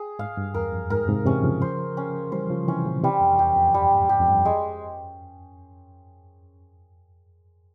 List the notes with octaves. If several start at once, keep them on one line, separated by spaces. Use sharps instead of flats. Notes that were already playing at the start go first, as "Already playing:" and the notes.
Already playing: G#4
G#2 F5
G2
E2 A#4
F2
G#2 A#4
G#2 C3
C3 E3 C#4
C#3 F3
C5
C#4
E3 G3 C5
C#3 F3
C3 E3 C#4
A#2 C#3
C3 E3 G3
F2
E2 G4
F2
G2 G3
G#2
G4
F2
G2
F2 G#3